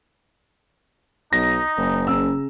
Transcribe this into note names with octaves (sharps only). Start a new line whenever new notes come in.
B1 D#4 A#6
F#1
C#3 A#5 E6